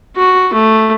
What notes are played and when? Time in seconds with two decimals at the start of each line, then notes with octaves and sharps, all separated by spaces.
0.16 F#4
0.53 A3